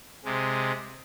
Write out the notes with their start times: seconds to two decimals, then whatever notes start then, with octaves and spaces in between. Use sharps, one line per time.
0.25 C3 G#3